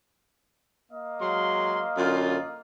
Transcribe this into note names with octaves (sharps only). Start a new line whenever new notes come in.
A#3 D#5 F5
F#3 G#3 C6
F#2 D3 F4